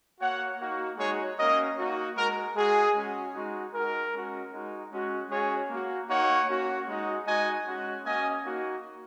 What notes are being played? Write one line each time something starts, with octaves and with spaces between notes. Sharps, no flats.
A#3 F#4 C#5 F#5
A#3 D#4 F#4
G#3 D#4 F#4 G#4 C#5
A#3 C#4 F#4 A#4 D#5
A#3 D#4 F#4
G#3 F#4 A#4
G#3 F#4 G#4
G#3 C#4 F#4
G#3 D#4 F#4
G#3 D#4 F#4 A#4
G#3 C#4 F#4
G#3 D#4 F#4
G#3 C#4 F#4
G#3 C#4 F#4 G#4 C#5
A#3 F#4
A#3 D#4 F#4 C#5 F#5
A#3 C#4 F#4
G#3 D#4 F#4
G#3 D#4 F#4 D#5 G#5
G#3 C#4 F#4
A#3 C#4 F#4 D#5 G#5
A#3 D#4 F#4